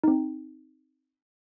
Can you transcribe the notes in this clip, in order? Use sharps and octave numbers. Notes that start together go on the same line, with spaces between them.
C4 D#4